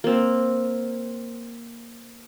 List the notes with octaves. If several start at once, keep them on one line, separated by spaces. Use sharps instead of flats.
A#3 C4